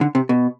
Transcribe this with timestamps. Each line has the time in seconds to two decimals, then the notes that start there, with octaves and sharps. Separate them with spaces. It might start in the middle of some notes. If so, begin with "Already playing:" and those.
0.01 D3
0.15 C3
0.29 B2